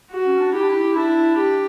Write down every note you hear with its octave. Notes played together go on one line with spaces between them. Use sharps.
F#4
C#4
D4
E4 G4
D4
E4
D4 E4
G4